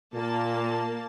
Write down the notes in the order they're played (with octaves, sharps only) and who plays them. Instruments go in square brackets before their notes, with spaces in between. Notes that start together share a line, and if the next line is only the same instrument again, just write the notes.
[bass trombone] A#2 [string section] A#3 A5